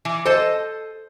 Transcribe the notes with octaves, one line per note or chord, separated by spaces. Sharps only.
E3
A4 C5 D#5 A5